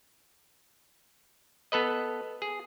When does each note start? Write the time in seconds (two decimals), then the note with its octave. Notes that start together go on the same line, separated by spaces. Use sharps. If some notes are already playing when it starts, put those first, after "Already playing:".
1.72 B3 A4 B4 D#5
2.42 G#4